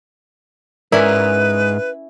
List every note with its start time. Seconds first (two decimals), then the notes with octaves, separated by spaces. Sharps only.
0.92 G#2 C#4 E4 A#4 B4 D5